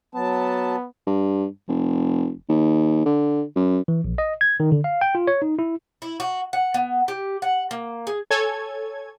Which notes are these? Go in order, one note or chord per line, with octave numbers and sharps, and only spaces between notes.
F#3 B3 A5
G2
F1
D#2
D3
F#2
E3
A#1
D#5
G#6
D#3
D3
F5
G5
F4
C#5
D#4
E4
E4
F#4
F#5
B3
G4
F#5
A#3
G#4
A4 C#5 G#5 G#6